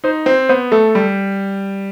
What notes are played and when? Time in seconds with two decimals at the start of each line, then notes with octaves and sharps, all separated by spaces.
0.04 D#4 C5
0.26 C4 C5
0.49 B3 C5
0.72 A3 A4
0.95 G3